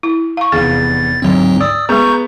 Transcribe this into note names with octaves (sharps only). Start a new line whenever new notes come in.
E4
F5 C#6
F1 E2 G#4 F5 A6
D2 G#2 F#3 C4
D5 D#6 E6
G#3 B3 G#4 A#5 C#6 G6